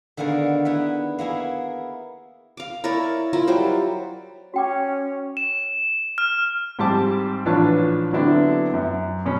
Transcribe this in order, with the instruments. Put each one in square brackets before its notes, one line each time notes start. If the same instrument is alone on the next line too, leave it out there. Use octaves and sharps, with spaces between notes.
[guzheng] D3 D#3 A#3 B3 G#4 A#4
B3 E4 B4
A#3 B3 E4 G#4
[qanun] F5 D6
E4 A#4 C#5 D5
E4 F4 A#4
F#3 G3 C5
[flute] C#4 [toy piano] F#4 G5 D6 [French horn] C#5
[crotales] E7
F6
[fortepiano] G#2 G3 C4 A5 D6
A1 F3 D4 B4 C#5 A5
D3 F#3 B3 C4 D4 E4
F#2
B2 C#4